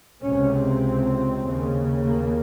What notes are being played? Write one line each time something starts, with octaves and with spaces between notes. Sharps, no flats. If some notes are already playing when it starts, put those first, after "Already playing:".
C#2 C3 C#4
C4
D#2 C#3
A#3